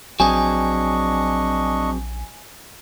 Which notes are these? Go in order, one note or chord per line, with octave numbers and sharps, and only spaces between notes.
A#1 F#3 C4 D4 G#4 D#5 G#5 C#6